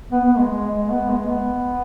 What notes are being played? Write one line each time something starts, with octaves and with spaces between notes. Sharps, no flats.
B3
B3
G#3
G#3
G#3
B3
G#3
B3